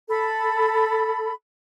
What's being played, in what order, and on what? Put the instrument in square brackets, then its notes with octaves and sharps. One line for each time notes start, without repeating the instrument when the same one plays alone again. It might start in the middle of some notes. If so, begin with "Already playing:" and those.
[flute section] A4 B5